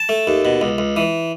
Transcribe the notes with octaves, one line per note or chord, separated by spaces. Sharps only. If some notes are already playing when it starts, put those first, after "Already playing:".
Already playing: A5
A3
D#2
B2
C#2
C#2
E3